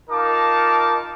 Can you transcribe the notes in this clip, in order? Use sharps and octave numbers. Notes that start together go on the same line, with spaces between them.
D#4 F4 A#4 A5 D6